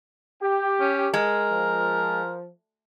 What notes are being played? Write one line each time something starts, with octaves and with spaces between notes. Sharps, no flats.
G4
C#4
G#3 A#4
F3